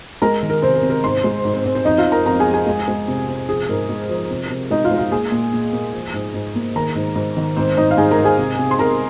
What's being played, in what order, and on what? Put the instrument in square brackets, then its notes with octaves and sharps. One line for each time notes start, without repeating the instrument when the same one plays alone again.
[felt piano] G#3 A#4 A#5
D#3
A#4
C3 C4 C5
A#4
C3
A#4
G#2 C5 C6
G#3
G#2
C4 C5
G#2 C4 C5
C4 C5
F2 D#4 D#5
F4 F5
F3
A#4 A#5
F2 A#4 A#5
G#4 G#5
F3
G#4 G#5
G#3
G#3
C3
C3
F3 G#4
G#2 A#4
G#3
F3
C3
C3
G#3 D#4 D#5
F4 F5
G#3
F4 F5
A#3 G#4 G#5
A#2
A#2
A#3
F3
G#2
G#2
A#3
D#3 A#4 A#5
G#2
G#2
D#3
G#2 C4 C5
G#2 D#4 D#5
F5
G#2 G#4 G#5
A#4 A#5
G#2
G#4 G#5
C3
C3
C6
C3 A#4 A#5